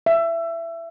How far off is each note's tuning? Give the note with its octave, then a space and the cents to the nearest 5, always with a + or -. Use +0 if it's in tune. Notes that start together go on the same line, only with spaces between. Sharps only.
E5 +20